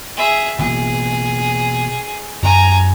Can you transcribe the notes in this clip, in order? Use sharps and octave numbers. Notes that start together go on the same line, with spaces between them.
G#4 E5
B2 E3 A#3 G#4
F#2 G#5 A#5